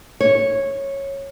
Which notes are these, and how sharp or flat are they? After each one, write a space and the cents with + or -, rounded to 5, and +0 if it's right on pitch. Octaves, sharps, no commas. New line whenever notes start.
C#5 -10